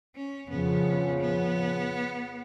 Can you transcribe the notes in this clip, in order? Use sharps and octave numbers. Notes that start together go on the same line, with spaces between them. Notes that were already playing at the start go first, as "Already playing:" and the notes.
C#4
F2 C#3 F3 B3
B3